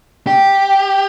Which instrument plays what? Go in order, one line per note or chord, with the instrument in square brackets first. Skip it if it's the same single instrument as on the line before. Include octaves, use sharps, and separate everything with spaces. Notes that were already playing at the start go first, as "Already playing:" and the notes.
[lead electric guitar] G4